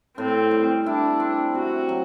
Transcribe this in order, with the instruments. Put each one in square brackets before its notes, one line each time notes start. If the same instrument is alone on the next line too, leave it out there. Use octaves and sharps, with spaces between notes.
[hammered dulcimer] A2 [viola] C4
[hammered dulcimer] G3
[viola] D4 [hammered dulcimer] E4
[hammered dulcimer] C4
[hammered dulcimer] C3 [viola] F#4
[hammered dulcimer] F#3